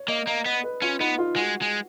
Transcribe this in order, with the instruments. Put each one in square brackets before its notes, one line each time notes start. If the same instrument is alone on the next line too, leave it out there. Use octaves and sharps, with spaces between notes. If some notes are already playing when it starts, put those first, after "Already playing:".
Already playing: [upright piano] C#5
[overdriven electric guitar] A#3 [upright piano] D#5
[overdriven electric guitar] A#3 [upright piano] D#5
[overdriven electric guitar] B3 [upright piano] D#5
[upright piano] B4
[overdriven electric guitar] C#4 [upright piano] F4
[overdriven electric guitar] B3 [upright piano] D#4
[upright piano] F4
[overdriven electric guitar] G#3 [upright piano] F#4
[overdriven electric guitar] G#3